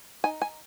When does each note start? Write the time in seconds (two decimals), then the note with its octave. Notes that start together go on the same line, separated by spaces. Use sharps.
0.24 D#4 G#5
0.42 G#5